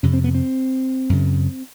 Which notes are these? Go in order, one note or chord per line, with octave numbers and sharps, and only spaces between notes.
F2 C3 C#4
C4
B3
C4
F#2 C#3